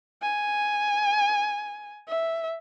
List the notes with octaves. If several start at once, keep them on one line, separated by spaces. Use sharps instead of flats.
G#5
E5